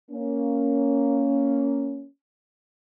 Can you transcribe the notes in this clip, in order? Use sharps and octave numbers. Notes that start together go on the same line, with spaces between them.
A#3 C#4